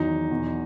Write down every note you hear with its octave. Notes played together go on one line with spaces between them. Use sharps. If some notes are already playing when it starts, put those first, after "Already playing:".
Already playing: E2 D#3 F#3 D#4
E2 B2 F#3